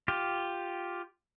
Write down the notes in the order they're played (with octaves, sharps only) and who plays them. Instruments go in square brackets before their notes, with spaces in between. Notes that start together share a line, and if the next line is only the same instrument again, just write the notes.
[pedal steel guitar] F4 G4